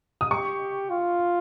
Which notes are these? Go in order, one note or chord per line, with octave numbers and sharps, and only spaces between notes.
D#6
G4 C#6
F4